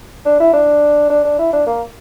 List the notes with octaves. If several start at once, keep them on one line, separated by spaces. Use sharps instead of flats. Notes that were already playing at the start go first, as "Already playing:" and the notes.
D4
E4
D4
D4
D4
E4
D4
A#3